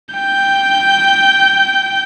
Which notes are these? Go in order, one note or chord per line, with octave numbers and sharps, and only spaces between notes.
G5 G6